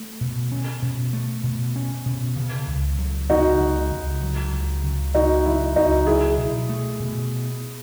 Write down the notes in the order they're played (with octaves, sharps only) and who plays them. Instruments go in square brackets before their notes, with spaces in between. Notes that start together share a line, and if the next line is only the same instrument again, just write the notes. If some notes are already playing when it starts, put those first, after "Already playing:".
Already playing: [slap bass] A3
B2
C#4
B2
A3
B2
C#4
B2
C#3
C#2
F#3
[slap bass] C#2 [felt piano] D#4 F#4
[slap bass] C#3
C#2
F#3
C#2
C#3
[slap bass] C#2 [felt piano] D#4 F#4
[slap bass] F#3 [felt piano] E4
[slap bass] C#2 [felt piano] D#4 F#4
[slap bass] F#3 [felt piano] E4 G#4
[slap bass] B2
A3
B2